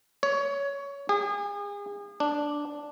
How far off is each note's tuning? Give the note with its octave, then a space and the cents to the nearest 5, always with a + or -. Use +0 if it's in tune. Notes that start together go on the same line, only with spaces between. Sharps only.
C#5 +15
G#4 -35
D4 +0